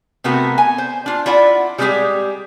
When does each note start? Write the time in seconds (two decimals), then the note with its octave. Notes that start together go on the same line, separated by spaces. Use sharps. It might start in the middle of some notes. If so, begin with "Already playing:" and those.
0.24 C3 A3 B3 F#4 A#4
0.58 G#5
0.78 C5
1.06 D4 F4
1.26 E4 F4 D5 F#5
1.78 G3 G#3 C#4 F4 G4 G#4